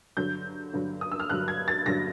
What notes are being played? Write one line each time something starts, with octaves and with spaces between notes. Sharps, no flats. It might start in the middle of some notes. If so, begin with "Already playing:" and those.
G2 D3 F#3 G6
G2 D3 F#3
D#6
E6
F6
G2 D3 F#3 F#6
G#6
A6
G2 D3 F#3 A#6